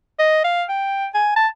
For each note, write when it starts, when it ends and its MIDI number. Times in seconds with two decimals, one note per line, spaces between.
0.19 0.44 75
0.45 0.64 77
0.69 1.07 79
1.14 1.32 80
1.36 1.47 81